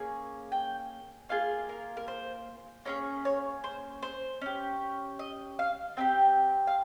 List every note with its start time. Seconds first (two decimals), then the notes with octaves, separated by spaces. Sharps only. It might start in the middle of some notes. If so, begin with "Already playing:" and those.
Already playing: A#3 C#4 G#4
0.52 G5
1.29 A#3 F4 G#4 F5
1.69 A#4
1.97 A#4
2.08 C5
2.85 A#3 C#4 G#4 C#5
3.25 C#5
3.64 C5
4.02 C5
4.42 C#4 G4
5.19 D#5
5.59 F5
5.97 C4 D#4 G4 G5
6.67 F5